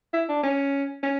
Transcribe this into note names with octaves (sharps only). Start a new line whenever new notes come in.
E4
D4
C#4
C#4